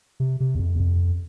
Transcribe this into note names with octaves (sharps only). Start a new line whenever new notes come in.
C3
C3
E2
F2
E2
F2